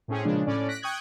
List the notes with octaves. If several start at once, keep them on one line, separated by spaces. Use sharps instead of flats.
A2 C4 C#4 G#4
A#2 C#3 F3 G#3 D4
A2 C#4 D5
F#6 A#6 B6 D7
G5 C#6 D#6 F#6 G#6